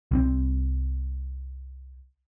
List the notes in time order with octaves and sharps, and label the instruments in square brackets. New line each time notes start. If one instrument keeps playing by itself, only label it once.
[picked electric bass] C2 G3 C4